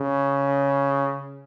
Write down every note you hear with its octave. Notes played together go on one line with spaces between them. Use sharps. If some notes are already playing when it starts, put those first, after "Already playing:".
Already playing: C#3